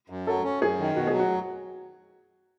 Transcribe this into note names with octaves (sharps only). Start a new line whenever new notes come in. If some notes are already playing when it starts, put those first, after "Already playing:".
F#2
F#3 A4
C#4
F#2 G#4
D#3
B2 F#4
G#4
F#3
F#4